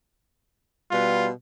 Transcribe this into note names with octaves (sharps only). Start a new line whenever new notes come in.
B2 G3 B3 F4